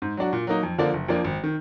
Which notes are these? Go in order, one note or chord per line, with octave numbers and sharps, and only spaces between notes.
G#2
F#3 D4 F#4
A#2
F#3 A#3 D#4
F2
D3 F3 A#3 D4
F#1
F2 F3 A#3 D4
G#1
D#3